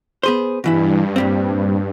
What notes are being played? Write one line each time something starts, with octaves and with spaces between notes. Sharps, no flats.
B3 G#4 C5
G2 B2 E3 E4
A#2 G3 C4